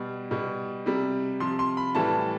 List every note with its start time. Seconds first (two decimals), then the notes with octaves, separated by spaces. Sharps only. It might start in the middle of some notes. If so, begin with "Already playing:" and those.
Already playing: B2 G3
0.31 B2 G3
0.86 C3 G3
1.40 C3 F3 C6
1.59 C6
1.77 B5
1.95 A2 E3 G3 A5